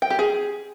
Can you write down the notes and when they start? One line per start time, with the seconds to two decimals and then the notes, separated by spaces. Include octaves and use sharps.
0.02 G5
0.10 G4
0.19 G#4